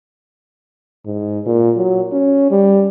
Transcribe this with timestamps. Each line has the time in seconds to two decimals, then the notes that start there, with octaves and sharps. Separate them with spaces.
1.06 G#2
1.46 A#2
1.77 F#3
2.12 C#4
2.51 G3